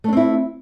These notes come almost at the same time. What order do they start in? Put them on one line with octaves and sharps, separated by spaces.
A3 D4 C4 E4